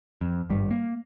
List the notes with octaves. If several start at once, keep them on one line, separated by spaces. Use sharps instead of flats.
F2
G#1 G2 G3
A#3